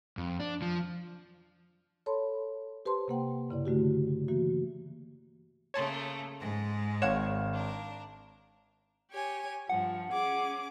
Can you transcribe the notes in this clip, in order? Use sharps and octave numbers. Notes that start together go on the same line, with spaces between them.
F2
D4
F3
A4 C#5 A5 B5 C6
G4 B4 C5 A5 C6
C3 A#3 F#5 G5
G2 C#3 E4 D5
D3 A3 F#4 G4
E3 A#3 F#4
C#3 A3 A#3 C#5 A5 C6
G#2 G#3
G#1 C#5 F5 F#5 G#6 E7
D4 A#4
G4 C#5 G#5
G2 F3 F#5
C#4 G#4 D6